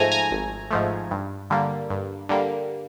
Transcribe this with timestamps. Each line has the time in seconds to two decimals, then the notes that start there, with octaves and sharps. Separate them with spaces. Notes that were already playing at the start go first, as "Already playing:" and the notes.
Already playing: G#2 F3 A3 G#5 A#5
0.12 G#5 A#5
0.31 G#1
0.71 G#2 F3 A3
1.11 G2
1.50 D3 G3 A#3
1.90 G2
2.29 D3 G3 A#3